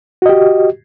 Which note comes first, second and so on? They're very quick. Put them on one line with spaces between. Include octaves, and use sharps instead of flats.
F#4 D#5 G4